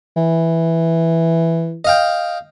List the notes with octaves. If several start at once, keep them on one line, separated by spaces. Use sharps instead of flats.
E3
D#5 F5 G5